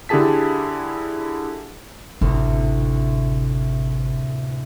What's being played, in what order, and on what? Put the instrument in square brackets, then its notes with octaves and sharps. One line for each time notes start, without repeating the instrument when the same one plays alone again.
[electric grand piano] D3 E4 G4 G#4 A5 B6
[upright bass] G#1 [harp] D2 A2 C3